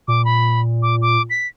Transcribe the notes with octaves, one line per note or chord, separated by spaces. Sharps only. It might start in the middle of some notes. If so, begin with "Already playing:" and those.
A#2 D6
B5
D6
D6
B6